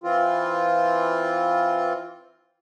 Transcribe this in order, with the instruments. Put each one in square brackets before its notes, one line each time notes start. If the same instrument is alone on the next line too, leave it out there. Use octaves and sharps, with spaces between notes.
[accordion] E3 C4 F4